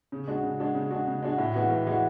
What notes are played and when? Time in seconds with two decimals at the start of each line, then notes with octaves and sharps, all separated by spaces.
0.12 C#3
0.28 G#3 D4 F#4
0.43 C#3
0.59 G#3 D4 F#4
0.75 C#3
0.91 G#3 D4 F#4
1.08 C#3
1.22 G#3 D4 F#4
1.38 A2
1.54 E3 G#3 B3 F#4
1.70 A2
1.86 E3 G#3 B3 F#4